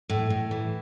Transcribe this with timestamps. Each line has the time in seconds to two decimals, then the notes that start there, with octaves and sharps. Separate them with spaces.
0.09 A2
0.30 A2
0.51 E3